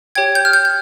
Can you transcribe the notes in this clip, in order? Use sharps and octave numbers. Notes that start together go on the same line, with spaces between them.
G4 C#5 G5 G#6
G6
F6
G6
G6